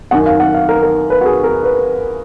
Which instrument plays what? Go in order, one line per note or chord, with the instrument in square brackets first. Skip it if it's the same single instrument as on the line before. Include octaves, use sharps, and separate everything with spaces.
[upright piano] F#2 D#3 F#5
F5
F#5
F5
A#4
A#4
B4
F#4
G#4
A#4
B4